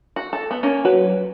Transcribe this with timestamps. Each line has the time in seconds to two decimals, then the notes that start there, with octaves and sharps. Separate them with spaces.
0.16 F#4
0.33 A4
0.51 B3
0.63 A#3 C#4
0.85 F#3 B4